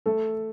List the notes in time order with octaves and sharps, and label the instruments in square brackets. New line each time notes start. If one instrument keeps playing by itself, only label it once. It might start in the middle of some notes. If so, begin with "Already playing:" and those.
[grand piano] A3 A4